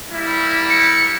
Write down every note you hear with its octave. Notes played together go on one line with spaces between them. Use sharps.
G3 A#3 E4
C#7